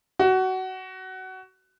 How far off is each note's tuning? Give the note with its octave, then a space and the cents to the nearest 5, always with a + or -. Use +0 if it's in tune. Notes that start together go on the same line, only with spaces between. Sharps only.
F#4 +20